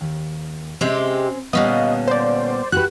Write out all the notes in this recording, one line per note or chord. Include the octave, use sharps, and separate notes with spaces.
D#2
C3 G#3 C4 C#4 G4
A#2 D3 G3 B3 C#4 D#5 F5
C5 D5
F#4 G4 B4 F#6